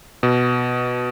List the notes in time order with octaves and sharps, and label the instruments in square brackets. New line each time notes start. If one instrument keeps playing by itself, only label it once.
[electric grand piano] B2